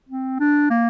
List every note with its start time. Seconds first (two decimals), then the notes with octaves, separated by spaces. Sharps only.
0.09 C4
0.40 D4
0.70 A#3